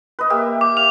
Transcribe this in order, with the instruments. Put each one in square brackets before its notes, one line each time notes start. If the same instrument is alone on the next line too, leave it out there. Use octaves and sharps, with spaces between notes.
[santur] B4 D#5
A#3 G4 E5
[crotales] D6
[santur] F5 [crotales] F7